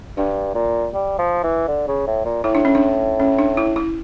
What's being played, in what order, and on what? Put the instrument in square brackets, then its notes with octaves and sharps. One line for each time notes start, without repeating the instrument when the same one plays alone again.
[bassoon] G2 [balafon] D4
[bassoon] A#2
G3
F3
E3
D3
C#3
A2
A#2
[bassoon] A2 [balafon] E4
[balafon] D4
C#4
D4
C#4
D4
E4
E4